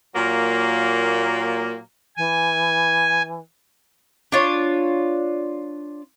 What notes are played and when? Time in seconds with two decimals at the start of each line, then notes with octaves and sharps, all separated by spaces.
0.14 A#2 F#3 A#3
2.17 E3 G#5
4.32 D4 F4 C#5